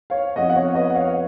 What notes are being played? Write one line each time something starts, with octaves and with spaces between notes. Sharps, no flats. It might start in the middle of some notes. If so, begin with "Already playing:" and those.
C#5 F5
F2 F3 B3 D#5 F#5
F#5
C#5 F5
B4 D#5
F#5
C#5 F5